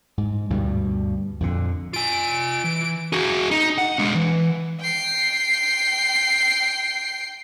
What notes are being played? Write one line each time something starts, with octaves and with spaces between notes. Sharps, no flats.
G#2
D2 G2 B2 G3
F2 A#2 D3
F4 G#5 D7
E3
F#4 G#4
D#4
F#5
G#3 D4
E3
G5 C7